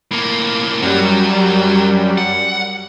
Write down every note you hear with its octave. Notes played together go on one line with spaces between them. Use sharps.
A2 A#3
F#2 F#3 G3
F#5